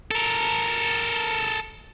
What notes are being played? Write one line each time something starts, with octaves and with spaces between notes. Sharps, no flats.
A4 A#4